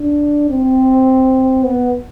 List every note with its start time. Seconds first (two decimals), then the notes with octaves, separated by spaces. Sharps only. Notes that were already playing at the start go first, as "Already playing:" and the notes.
Already playing: D4
0.49 C4
1.64 B3